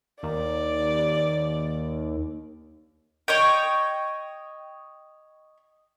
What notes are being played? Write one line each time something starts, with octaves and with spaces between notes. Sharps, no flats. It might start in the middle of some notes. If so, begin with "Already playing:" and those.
D#2 D5
C#5 D#5 G5